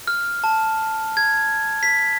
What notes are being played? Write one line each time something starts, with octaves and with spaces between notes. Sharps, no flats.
F6
A5
G#6
B6